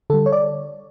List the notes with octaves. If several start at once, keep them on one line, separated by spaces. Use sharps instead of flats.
D3 G3 A4
C#5
D5